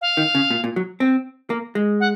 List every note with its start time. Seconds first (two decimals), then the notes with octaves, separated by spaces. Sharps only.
0.01 F5
0.17 D#3
0.35 C#3
0.50 A#2
0.64 A#2
0.76 F#3
1.00 C4
1.50 A#3
1.75 G#3
2.00 F#5